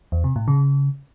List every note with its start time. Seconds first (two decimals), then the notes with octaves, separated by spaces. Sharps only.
0.12 E2
0.24 C3
0.36 A2
0.48 C#3